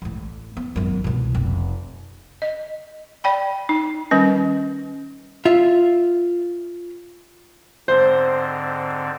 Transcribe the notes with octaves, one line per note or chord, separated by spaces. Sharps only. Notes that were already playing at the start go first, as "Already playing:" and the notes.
A1 A2
B3
G#1 F#2
C2 B2
F1
D#5
D5 G5 B5
D#4
D#3 G3 C#4 B4
F4 E5
G#2 D3 C4 C5